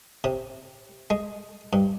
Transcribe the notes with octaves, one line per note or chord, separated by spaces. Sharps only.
C3
G#3
G2